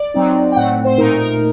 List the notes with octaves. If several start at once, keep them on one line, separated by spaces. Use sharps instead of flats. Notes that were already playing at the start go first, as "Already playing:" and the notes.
Already playing: D5
F#3 C4 D#4
G5
A2 A3 C4 F#5
C5
A#2 A3 D#4 A#4
A#4